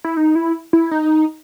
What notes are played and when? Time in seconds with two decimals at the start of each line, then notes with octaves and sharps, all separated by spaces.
0.04 E4
0.17 D#4
0.35 E4
0.73 E4
0.91 D#4